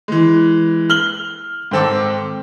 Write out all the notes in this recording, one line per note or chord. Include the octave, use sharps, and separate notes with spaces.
E3 G#3
F6 F#7 G7
G#2 D#3 C4 A4 D6